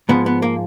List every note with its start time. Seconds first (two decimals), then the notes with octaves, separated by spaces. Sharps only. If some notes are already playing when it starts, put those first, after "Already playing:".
0.09 G#2 F3 G#3 B3
0.26 B3
0.42 A#3